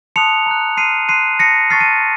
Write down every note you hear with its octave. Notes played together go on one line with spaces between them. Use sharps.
A5 C6 D#6 F#6 C#7 F7
A#5 D#6 F#6
C6 F6 C7 D#7
C6 F#6 C7 D#7
A5 D#6 F#6 A#6 C#7
A5 C#6 F6 A6 C7
C7 D#7